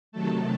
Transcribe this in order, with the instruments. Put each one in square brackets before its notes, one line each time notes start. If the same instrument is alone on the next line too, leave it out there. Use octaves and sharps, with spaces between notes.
[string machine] C3 D#3 F#3 A3 A4